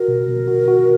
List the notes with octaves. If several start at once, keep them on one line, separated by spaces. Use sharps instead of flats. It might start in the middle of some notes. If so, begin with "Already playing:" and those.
Already playing: F#4 A#4
B2
B2
F#4
F#4